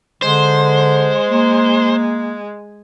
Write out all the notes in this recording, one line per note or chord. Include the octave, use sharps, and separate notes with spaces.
D3 G#3 C5
A#3